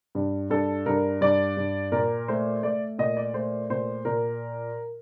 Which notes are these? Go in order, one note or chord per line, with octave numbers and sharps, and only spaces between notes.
G2
G2 A4
G2 A#4
G2 D5
G2
A#2 A#4
A3 C5
A3 D5
A#2 D#5
D5
A3 C5
A#2 C5
A#2 A#4